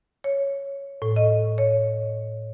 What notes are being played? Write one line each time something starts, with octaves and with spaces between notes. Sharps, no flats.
C#5
A2
D#5
C#5